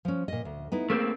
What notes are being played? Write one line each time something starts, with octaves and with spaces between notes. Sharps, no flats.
F3 C#4
A#2 D#5
D2
B3 D#4 E4
A3 A#3 C4 G#4